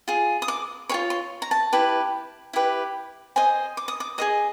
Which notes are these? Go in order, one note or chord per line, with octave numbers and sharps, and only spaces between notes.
F4 G#4
D#6
D6
F4 G#4 C#5 C#6
C6
A#5
A5
E4 G4 B4
E4 G4 B4
G#4 C5 D#5 G#5
D6
D#6
D6
G#4 C5 D#5 D#6